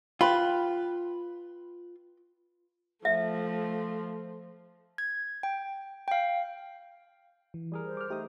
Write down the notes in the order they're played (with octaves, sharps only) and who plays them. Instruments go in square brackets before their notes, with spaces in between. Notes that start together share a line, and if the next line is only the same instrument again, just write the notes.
[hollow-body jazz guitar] F4 [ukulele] B4 G5 B5
[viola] F3 A3 [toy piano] E5
[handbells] G#6
G5
F5 G5
[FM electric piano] E3
[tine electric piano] G3 G#4 A#4
[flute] C5
[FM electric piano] D6 F6
[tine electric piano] A3 D#4 D#6 [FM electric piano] G4